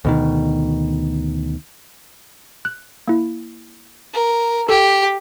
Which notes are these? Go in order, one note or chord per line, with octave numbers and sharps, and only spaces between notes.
D2 B2 D#3
F#6
A#3 E4
A#4
G4 A4